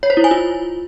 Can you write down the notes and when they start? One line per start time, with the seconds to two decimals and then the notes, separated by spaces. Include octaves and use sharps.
0.03 C#5
0.10 C5
0.17 E4
0.24 G#5
0.31 F4